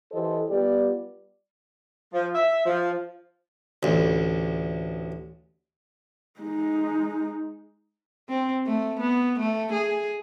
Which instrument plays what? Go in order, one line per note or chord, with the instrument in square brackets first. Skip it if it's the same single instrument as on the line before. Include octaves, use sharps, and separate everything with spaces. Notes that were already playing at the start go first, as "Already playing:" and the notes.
[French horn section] E3 G4 A4 C5 D#5
G3 B3 F4 G4 D5
[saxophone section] F3
E5
F3
[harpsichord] A1 D2
[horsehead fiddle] G#3 D#4
[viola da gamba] C4
A3
B3
A3
G#4